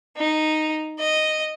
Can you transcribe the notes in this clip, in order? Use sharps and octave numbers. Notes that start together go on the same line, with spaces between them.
D#4
D#5